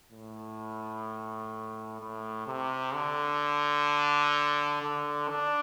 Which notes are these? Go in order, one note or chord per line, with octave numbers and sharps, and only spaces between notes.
A2
A2
C3
D3
D3
D4